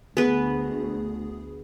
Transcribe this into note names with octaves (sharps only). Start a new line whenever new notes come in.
D2 B3 G#4 B4